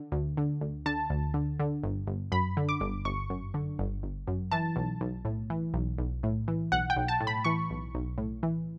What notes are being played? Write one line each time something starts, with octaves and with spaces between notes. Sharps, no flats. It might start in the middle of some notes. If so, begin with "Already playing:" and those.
Already playing: D3
D2
D3
D2
D3 A5
D2
D3
D3
G1
G1
F#2 B5
D3
D6
G1
G1 C#6
F#2
D3
G1
G1
F#2
E3 A5
B1
B1
A2
E3
B1
B1
A2
E3
B1 F#5
G5
B1
A5
A2
B5
E3 C#6
B1
B1
A2
E3